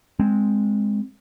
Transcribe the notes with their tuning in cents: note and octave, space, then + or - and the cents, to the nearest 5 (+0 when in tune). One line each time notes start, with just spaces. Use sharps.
G#3 +0 C4 +0